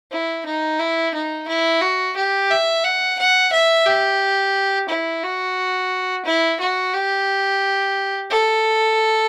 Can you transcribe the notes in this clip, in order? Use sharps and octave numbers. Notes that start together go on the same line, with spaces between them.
E4
D#4
E4
D#4
E4
F#4
G4
E5
F#5
F#5
E5
G4
E4
F#4
E4
F#4
G4
A4